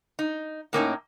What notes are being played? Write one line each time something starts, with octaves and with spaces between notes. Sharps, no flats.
D#4
A2 A#3 C#4 D#4